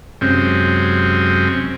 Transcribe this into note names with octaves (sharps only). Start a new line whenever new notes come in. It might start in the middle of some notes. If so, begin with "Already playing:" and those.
F#2 C3 G#3 C4 C#4